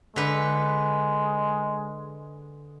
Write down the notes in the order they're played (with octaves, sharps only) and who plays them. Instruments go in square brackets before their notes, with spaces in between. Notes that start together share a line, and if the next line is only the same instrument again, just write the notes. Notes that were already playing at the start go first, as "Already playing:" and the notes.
[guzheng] D3 B4 [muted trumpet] G#3